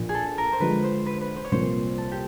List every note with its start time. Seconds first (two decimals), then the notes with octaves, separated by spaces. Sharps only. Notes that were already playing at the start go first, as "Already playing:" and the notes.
Already playing: A#1 A#2 F3 A#3
0.09 G#4
0.15 A4
0.38 A#4
0.53 C5
0.60 D3 F3 G#3 B4
0.84 C5
1.06 B4
1.21 B4
1.36 C5
1.45 C#5
1.52 C2 A#2 F3 A#3 C5
1.98 A4
2.12 G4